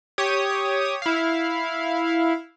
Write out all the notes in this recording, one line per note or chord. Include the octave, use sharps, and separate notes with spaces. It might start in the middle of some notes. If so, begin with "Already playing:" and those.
G4 C#5 D#6
E4 F5